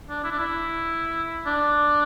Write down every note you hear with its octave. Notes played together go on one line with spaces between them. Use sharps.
D4
E4
D4
E4
D4